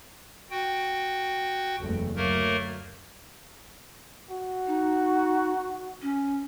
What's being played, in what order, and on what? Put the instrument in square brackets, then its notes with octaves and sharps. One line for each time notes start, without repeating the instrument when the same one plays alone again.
[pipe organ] F#4 G5
[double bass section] F#1 E2 A3
[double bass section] D2 F#3 [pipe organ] A3 A#3 A#4
[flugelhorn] F#4
[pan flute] D#4
C#4